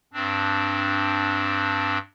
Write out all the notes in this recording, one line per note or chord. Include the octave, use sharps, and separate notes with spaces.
G2 C4 D4